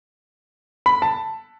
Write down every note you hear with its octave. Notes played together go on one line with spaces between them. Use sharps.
B5
A5